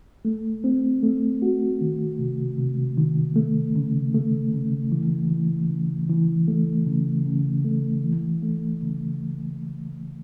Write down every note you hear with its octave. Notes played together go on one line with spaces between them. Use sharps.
A3
C4
A3
F#4
D#3
C3
C3
D#3
A3
C#3
A3
C#3
E3
E3
C#3
E3
A3
C#3
C#3
A3
E3
A3
C#3